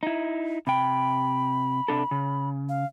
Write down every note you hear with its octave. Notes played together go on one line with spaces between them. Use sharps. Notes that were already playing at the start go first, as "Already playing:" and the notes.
D#4 E4
C3 G5 B5
C3 D4 A4
C#3
F5